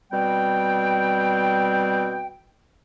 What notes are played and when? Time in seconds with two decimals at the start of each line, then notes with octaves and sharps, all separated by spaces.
0.12 B2 G3 C4 G5